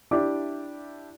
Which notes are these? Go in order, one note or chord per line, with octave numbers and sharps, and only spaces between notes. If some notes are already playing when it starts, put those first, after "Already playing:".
D4 E4 G4 D5 E5 D6